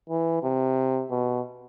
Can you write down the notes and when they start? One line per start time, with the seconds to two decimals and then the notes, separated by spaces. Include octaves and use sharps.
0.10 E3
0.43 C3
1.11 B2